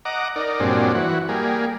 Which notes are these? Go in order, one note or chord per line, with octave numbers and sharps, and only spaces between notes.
D#5 F#5 A#5 D6
D#4 A#4 D5
G2 A#2 F#3 G#3 C4 D4
E3 F#4
G3 A#3 G#4